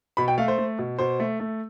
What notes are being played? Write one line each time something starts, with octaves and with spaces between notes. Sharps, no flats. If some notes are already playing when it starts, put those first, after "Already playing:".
B2 B5
G5
A3 F5
C5
A3
B2
B2 C5
A3
A3